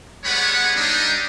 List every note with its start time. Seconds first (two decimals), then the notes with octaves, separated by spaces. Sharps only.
0.24 G3 G#3 B3 C#5 F#5 B5
0.75 G3 D4 D#4